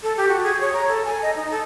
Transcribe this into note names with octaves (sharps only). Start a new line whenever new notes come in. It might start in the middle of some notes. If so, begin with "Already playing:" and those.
A4
G4
F#4
G#4
C#5
A#5
A4
G#5
D#5
D#4
A4